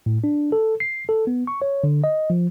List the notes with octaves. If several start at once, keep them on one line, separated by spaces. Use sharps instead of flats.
A2
D4
A4
C7
A4
B3
C#6
C#5
D3
D#5
F3